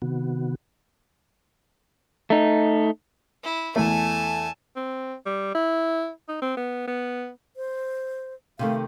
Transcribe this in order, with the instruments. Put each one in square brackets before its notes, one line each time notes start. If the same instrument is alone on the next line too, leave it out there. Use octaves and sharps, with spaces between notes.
[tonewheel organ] C3 D#3 B3 F#4
[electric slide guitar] A3 D#4
[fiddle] E4
[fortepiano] E2 A3 [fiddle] G#5 A5
[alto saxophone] C4
G3
E4
D#4
C4
B3
B3
[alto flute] C5
[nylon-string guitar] C3 D#3 A3 [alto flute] F5